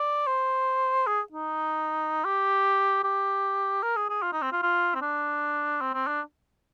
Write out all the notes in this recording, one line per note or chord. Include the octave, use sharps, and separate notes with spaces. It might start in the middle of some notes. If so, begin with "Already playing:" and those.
Already playing: D5
C5
G#4
D#4
G4
G4
A#4
G#4
G#4
F4
D#4
C4
F4
F4
C4
D4
C4
C4
D4